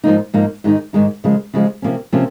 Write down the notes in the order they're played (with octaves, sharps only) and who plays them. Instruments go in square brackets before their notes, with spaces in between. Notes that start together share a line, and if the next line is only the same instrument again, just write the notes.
[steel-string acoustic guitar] G#2 F3 A#3 D#4
G#2 F3 A#3 D#4
G#2 D#3 G#3 D#4
G#2 D#3 G#3 D#4
F#2 C#3 F3 G#3
F#2 C#3 F3 G#3
C3 F3 A#3 C#4
C3 F3 A#3 C#4